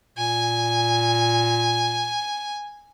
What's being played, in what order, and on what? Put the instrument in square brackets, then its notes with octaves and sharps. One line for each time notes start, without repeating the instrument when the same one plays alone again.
[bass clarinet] A#2 [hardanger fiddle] G#5